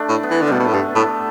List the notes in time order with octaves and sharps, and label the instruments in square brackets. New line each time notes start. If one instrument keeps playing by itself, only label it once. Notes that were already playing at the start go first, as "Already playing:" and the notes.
Already playing: [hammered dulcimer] A3 D4
[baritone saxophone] A2
[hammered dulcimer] B3
[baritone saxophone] E3
D3
[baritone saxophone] B2 [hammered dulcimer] G3 A3
[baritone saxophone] B2
A2
[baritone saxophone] G2 [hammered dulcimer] B3
[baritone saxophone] A2 [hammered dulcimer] A3